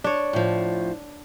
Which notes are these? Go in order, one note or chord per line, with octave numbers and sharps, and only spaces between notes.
D4 C#5
A2 F3